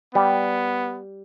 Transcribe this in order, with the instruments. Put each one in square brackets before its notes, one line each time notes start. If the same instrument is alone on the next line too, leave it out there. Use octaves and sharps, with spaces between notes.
[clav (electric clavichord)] G3 [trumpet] B3